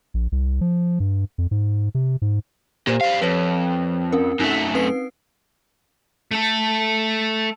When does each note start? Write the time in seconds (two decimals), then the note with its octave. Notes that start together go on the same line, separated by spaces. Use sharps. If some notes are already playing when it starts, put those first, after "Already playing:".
0.14 A#1
0.32 C2
0.61 F3
1.00 G2
1.38 F2
1.51 G#2
1.95 C3
2.22 G#2
2.87 A#2 G4 C5
3.01 G3 F5
3.22 F2 B4 C#5
4.13 C4 C#4 A#4
4.40 F#2 A3 C#4 D#4
4.74 C4 B4 C7
6.31 A3 A4